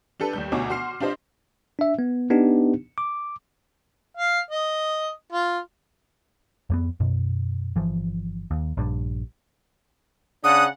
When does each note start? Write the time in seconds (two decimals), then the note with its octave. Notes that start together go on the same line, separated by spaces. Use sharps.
0.20 D4 G4 A4 B4
0.33 D#2 G3 G6
0.52 D2 B2 D#4 F#4 C#5 D6
0.70 F#4 C6 F6 C7
1.00 D4 F4 G4 C5 D#5
1.79 D4 E5
1.99 B3
2.30 B3 D4 D#4 G4
2.98 D6
4.17 F5
4.51 D#5
5.33 F4
6.70 F2 A#3 B3
7.00 F#2 B2
7.76 G1 E3 F3
8.51 D#2
8.77 A#1 G2
10.44 C#3 D4 F#5 D#6